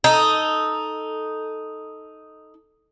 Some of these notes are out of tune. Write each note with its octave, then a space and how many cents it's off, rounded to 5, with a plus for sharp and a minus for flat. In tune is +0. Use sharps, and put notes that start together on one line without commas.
D#4 +0 A4 +0